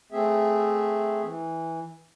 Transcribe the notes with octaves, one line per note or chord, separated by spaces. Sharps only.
A3 C4 G#4 E5
E3